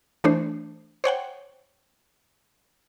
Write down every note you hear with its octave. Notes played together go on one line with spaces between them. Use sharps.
E3 A3 D4 C5
C5 C#5 F#5 G5